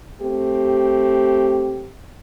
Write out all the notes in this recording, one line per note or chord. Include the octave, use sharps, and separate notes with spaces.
A3 C4 G4